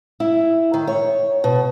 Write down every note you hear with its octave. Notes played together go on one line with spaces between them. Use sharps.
E4
D#3
C#5
B2